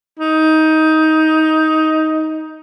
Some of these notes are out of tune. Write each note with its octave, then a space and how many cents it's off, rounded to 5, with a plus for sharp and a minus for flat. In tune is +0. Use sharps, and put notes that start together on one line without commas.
D#4 +15